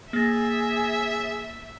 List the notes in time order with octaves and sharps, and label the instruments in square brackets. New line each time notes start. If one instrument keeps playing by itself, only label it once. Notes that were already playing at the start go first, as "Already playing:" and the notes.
[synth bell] A#3 A6 [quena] G#4 [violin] E5